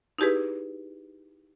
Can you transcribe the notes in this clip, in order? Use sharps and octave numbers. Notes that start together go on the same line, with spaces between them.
D#4 E4 G4 G#4 B4